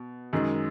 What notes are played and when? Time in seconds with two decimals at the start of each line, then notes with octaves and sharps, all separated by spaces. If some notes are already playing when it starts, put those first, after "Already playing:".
Already playing: B2
0.33 F#2 D#3 G#3